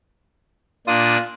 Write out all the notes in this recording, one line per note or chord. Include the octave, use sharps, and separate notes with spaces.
A#2 D4 F4 D#6